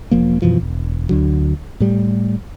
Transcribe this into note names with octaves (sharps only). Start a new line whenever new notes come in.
E1 F3 A#3
F#2 B2 E3 F3
E1
D2 D3 F#3
A2 G3